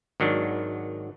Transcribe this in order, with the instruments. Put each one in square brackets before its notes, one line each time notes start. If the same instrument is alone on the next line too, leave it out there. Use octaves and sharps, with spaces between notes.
[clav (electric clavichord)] G#1 D#3 F#3 D4